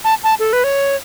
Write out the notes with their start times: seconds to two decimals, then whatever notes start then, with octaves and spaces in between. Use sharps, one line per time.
0.04 A5
0.24 A5
0.39 A4
0.53 B4
0.64 C#5